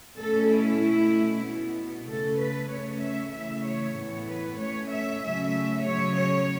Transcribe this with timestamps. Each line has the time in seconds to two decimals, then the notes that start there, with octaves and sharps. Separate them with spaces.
0.17 B2 A3 C#4 A4
0.49 E4
0.80 B2 A3 C#4
1.43 B2 B3
2.07 C#3 A3 C#4 A4
2.39 B4
2.71 C#3 A3 C#4 C#5
3.02 E5
3.33 C#3 E3 A3 E5
3.65 C#5
3.96 A2 E3 B3
4.29 B4
4.60 A2 A3 C#4 C#5
4.92 E5
5.24 C#3 F#3 A3 C#4 E5
5.87 C#3 F#3 C#4 C#5
6.18 C#5